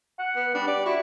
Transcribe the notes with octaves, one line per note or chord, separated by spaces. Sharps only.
F#5
B3
G3 D4
G4 D5
E4 F#4